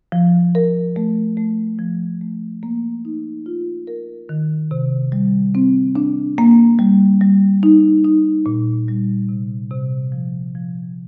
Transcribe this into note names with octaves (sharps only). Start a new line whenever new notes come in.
F3
A#4
A3
A3
F3
A3
A#3
D#4
F4
A#4
D#3
C3
G3
C4
D4
A#3
G3
G3
D#4
D#4
A#2
G3
C3
C3
F3
F3